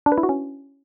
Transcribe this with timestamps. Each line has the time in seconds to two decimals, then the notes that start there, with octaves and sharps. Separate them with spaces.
0.06 D4
0.12 B4
0.18 E4
0.23 F#4
0.29 C#4